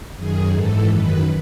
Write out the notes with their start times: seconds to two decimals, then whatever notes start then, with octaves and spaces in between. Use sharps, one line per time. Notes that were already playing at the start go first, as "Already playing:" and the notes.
0.16 F#2 D#3 G#4
0.52 G#2 E3 A4
0.87 F#2 D#3 B4